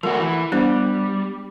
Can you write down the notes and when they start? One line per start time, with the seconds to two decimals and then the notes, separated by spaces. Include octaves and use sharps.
0.03 F3 A3 F#4 A#4
0.20 E3
0.52 G3 B3 D4 C5